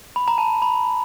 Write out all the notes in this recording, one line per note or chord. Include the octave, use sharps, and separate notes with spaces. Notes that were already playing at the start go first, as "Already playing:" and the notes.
B5
A#5
A5
B5